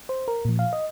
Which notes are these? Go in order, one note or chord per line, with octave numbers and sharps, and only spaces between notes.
C5
A#4
A#2 F3
F5
D#5